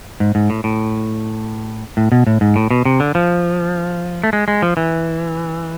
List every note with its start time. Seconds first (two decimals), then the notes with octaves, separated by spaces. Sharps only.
0.20 G#2
0.35 G#2
0.50 A2
0.64 A2
1.97 A2
2.12 B2
2.27 A2
2.41 G#2
2.56 A2
2.71 B2
2.85 C3
3.00 D3
3.15 F3
4.24 A3
4.33 G#3
4.48 G#3
4.62 F3
4.77 E3